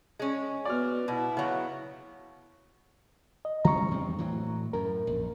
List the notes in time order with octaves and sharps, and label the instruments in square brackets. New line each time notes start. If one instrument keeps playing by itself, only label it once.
[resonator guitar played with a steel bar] G#3 C#4
[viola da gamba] B3 F#4 [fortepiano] D5 F6
[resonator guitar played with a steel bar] B2 [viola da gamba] E4
[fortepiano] C#3 [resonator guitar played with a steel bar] F#3 B3
[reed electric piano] D#5
[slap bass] E3 G#3 C#4 [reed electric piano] A#5 C#6
[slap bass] E2 G2 C4
A2 E3 F#3
[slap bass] F#2 A2 [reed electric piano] A#4
[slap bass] A#1